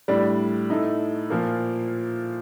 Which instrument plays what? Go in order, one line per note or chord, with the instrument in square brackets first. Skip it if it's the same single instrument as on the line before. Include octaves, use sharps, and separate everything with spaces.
[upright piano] A2 G3 D4
A2 A3 D#4
A#2 F3 A#3